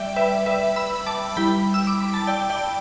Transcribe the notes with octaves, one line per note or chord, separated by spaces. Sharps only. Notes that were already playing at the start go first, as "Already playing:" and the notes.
Already playing: G3 D5 E5 G5
B4 E5
B4 E5
B5 E6
A5 D6
G3 E4 G5 B5
E6
D6
B5
A5
D5 G5
D5 G5